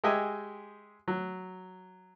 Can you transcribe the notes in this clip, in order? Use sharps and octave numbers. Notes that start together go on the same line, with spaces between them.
G#3 G4 D#5 E5 G5 G#5
F#3